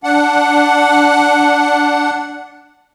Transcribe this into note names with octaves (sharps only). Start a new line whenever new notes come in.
D4 F#5